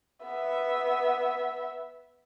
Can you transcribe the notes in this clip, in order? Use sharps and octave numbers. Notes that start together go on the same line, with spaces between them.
B3 E5